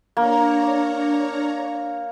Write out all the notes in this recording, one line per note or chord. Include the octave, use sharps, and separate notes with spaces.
A#3 D4 C#5 A#5